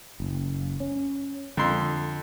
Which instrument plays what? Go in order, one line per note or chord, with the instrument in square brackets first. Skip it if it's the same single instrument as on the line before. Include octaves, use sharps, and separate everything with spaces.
[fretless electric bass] F#1
C#4
[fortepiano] F2 C6 [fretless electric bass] D3